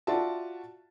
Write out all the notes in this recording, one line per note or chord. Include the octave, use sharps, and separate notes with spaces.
F4 F#4 D5 E5 A5